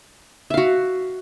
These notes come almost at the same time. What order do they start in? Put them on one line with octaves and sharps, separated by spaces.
E5 F5 F#4